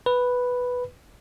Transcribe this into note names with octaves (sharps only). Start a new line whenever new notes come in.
B4